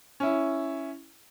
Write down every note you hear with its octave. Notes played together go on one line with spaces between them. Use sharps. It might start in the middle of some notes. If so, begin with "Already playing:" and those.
C#4 E4